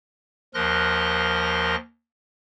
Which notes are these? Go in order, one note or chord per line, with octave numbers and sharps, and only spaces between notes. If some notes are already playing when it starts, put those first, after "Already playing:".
D#2 F3 A#4 C6 F#6 A#6